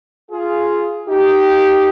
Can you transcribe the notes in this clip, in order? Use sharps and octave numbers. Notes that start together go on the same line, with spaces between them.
F4 G#4
D#4 G4